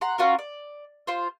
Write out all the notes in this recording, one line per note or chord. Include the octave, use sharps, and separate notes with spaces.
F#5 A#5 C6
C#4 F4 F#4 A#4
D5
F4 C5